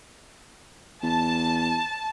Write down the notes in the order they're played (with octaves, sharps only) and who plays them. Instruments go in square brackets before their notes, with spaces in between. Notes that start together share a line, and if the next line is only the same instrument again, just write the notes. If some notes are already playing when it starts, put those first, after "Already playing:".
[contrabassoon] E2 [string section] A5